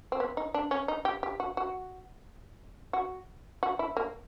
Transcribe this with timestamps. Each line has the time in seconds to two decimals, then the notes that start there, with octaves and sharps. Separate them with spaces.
0.12 C4
0.20 B3
0.37 D#4
0.54 D4
0.71 C#4
0.88 D#4
1.05 G4
1.23 G4
1.40 F#4
1.57 F#4
2.93 F#4
3.63 F#4
3.79 E4
3.97 A#3